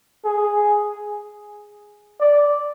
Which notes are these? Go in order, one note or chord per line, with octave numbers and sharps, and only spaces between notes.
G#4
D5